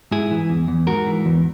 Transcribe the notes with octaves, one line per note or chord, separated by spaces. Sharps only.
G#2 E4 G#4
E3
E2
E2
G#2 F#4 A#4
E3
E2